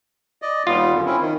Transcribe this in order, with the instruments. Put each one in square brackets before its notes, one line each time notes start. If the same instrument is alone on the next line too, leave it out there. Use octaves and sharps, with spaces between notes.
[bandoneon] D5 D#5
[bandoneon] D#2 G3 B3 [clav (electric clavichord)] F4
[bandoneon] F#2 D3
C4 C#4 E4
D#3